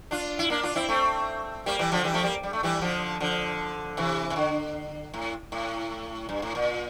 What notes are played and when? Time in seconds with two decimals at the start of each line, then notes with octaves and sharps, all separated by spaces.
0.11 D4 F4
0.39 E4
0.50 A#3 D4
0.63 D4 F4
0.75 C4 E4
0.88 A3 C4
1.66 G3 A#3
1.79 E3 G3
1.92 D3 F3
2.04 E3 G3
2.14 F3 A3
2.24 G3 A#3
2.43 G3
2.53 A3
2.63 E3 G3
2.81 D3 F3
3.20 D3 F3
3.97 C3 E3
4.30 C3
4.36 D3
5.14 A2
5.52 A2
6.29 G2
6.42 A2
6.55 A#2